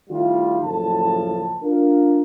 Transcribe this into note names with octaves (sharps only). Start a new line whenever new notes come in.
D#3 G3 A3 E4 F4
F#1 A2 F3 A4 A5
D4 F4 A#4